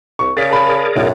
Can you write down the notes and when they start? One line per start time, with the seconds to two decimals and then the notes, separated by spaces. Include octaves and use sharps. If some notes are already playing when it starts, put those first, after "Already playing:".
0.19 C2 C#6
0.37 C#3 G#4 A#4 D5 A6 B6
0.49 A5 B5
0.96 B1 F#2 A2